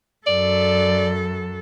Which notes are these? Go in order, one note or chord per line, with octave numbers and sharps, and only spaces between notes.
F#2 A4 D5